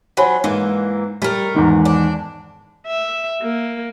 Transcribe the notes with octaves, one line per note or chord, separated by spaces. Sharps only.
F#3 C4 F#5 G#5 B5
G#2 E3 A#3
G3 A3 A#4
E2 G#2 D#3
D4
E5
A#3